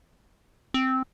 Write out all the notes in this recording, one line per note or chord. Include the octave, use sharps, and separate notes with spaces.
C4